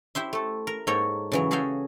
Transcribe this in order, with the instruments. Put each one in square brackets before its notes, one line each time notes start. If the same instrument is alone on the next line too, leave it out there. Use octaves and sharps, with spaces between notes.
[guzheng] E4 G4 C5 E5
A3 A4
A#4
G#2 A#3 A4 C#5 G5 A#5
C#3 E3 F#3
F#4 G#4 A4 E5 F5 G5